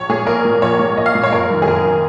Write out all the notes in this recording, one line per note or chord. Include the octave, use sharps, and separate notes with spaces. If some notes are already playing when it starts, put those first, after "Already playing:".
Already playing: A#1 C#5
A#2 G#4
A#1 A#4
A#2
A#1 C#5
A#2
A#1 D#5
F5
A#2
C#5
F#1 A#4
F#2 D#3
G#4
F#1 A#4
D#3